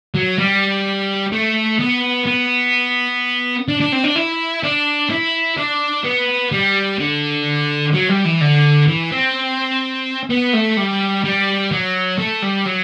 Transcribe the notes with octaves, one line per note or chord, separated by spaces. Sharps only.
F#3
G3
A3
B3
B3
D4
D4
C4
D4
E4
D4
E4
D4
B3
G3
D3
F#3
G3
E3
D3
E3
C4
B3
A3
G3
G3
F#3
A3
G3
F#3